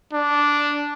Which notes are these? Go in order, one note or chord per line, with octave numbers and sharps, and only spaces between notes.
D4